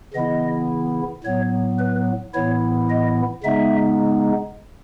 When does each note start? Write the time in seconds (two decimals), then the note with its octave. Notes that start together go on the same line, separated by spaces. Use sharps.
0.14 C#3 E3 B3 E4 D#5
1.24 A2 F#3 B3 C#5
1.78 B4
2.34 A2 E3 B3 E4 C#5
2.89 D#5
3.43 C#3 G#3 B3 D#4 E5